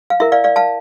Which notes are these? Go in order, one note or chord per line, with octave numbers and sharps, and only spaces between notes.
F5
E4 A#4 E5
D5 F5
D5 F5
F5 A5